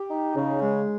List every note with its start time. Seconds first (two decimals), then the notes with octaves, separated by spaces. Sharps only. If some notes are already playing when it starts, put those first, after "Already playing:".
Already playing: G4
0.09 D#4
0.35 C#3
0.61 G#3